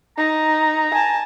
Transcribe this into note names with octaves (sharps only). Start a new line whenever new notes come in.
D#4 A#5
G#5 A5